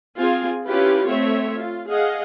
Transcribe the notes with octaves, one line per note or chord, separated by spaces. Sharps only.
C4 F4 G#4 G#5
C#4 E4 F4 G4 B4
A3 C4 C#5 E5
F4
G#4 D#5 F5 F#5